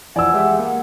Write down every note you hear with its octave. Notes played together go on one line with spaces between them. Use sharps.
E3 F3 D5 F#5 G#5 E6
G#3 G4 E5
A#3